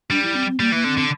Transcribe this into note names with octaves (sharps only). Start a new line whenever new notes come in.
G3 D4
E4
C4
C4
G3 A#3
E3 A#3
D3 C4
D3